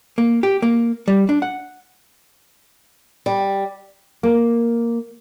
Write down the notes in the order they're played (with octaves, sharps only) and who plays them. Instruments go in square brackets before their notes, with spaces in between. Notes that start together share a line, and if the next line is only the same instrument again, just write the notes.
[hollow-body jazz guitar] A#3
G4
A#3
G3
D4
F#5
[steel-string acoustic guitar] G3
[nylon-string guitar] A#3